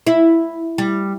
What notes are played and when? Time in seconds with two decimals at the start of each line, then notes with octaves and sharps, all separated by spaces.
0.07 E4
0.78 G3